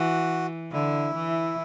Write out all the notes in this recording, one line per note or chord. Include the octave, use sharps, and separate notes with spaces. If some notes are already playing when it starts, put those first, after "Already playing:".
Already playing: E3 F#4
D3 E4
E3